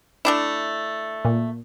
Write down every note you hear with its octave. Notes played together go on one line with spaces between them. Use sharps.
A3 D4 E4
A#2